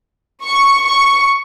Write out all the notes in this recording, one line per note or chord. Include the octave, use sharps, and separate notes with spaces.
C#6
C#6